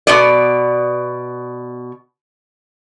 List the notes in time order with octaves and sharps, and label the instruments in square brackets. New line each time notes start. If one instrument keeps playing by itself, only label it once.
[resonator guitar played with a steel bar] B2 B3 D5